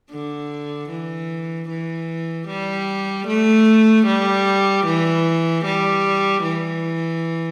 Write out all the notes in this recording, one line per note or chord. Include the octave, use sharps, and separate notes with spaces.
D3
E3
E3
G3
A3
G3
E3
G3
E3